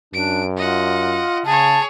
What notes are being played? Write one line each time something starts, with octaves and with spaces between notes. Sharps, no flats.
F#2 D4 D7
F4 D#5 F#5
C#3 G#4 C#5 A5